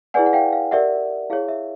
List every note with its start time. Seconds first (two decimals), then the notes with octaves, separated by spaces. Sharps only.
0.14 E4 G#4 B4 D5 F#5 G#5
0.26 F#5
0.33 F5 G5
0.53 F5
0.71 G4 A#4 D5 E5 F#5
1.30 E4 G#4 C#5 F5
1.48 E5